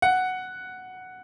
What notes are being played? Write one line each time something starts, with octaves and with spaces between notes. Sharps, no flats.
F#5